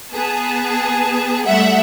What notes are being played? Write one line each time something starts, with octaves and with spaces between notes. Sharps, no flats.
B3 G#4 A5
G3 A3 E5 F#5